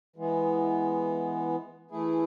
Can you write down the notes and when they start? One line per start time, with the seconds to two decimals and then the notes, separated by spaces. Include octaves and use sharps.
0.16 E3 G#3 B3
1.91 E3 A3 E4 G#4